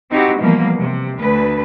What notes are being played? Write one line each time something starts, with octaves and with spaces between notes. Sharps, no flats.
C4 D#4 E4 F#4 G4
B2 E3 F3 G3 A#3
C3
D2 B4